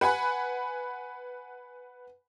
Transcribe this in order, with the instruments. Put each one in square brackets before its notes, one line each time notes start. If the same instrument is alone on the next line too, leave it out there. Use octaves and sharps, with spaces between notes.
[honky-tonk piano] B4 F#5 G#5 B5